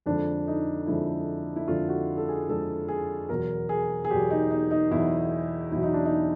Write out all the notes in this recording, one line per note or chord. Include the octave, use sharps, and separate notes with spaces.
F2 D3 F3 G#3 D4
D#4
F2 D3 F3 G#3 E4
E4
F2 D3 F3 G#3 F4
F#4
A4
G#4
F2 D3 F3 G#3 A4
G#4
E2 B2 F#3 A#4
G#4
G#4
E2 B2 F#3 G4
D#4
D#4
D#4
E2 B2 F#3 E4
E2 B2 F#3 E4
D#4
D4
D#4